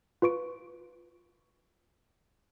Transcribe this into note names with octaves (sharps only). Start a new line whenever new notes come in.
F4 B4 C#6 D7